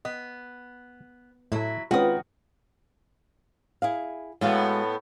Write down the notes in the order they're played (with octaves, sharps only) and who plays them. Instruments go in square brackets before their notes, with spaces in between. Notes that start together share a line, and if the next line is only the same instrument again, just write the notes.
[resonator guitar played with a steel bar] B3 [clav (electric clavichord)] D#5
[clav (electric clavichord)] A2 A3 [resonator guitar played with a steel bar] F#3 E4
[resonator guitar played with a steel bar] D#3 [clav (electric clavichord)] G#3 C4 C#4 [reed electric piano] F4 B4 [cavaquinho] F#4 D#6
[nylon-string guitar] E4 G#4 F5
[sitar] A2 B3 [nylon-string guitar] G#3 F#4 F5